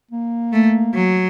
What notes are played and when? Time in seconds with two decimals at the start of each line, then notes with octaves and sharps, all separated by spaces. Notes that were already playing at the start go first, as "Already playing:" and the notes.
0.11 A#3
0.53 A3
0.94 F#3